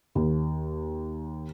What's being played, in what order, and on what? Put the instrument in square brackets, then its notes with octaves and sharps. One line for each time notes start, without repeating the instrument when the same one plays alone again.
[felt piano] D#2